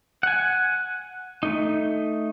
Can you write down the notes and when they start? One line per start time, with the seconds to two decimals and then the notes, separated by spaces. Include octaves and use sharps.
0.23 F#5 G#5
1.43 A3 D#4